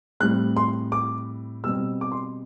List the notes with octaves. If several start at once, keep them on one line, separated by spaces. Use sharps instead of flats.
A2 G3 C4 F#6
C6
D6
B2 G3 C4 E6
D6
C6